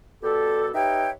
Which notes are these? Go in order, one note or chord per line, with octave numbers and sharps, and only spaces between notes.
B2 G3 G4 A4
D#4 G4 B4 C#5 E5 G5